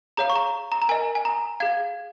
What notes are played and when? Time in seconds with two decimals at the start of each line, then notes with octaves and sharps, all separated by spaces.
0.17 G#4 C#5 F5 A#5
0.30 C#6
0.36 A#5
0.72 A#5
0.82 A#5
0.89 A#4 D#5 G#5
1.15 G#5
1.25 A#5
1.60 G#4 F5 G#6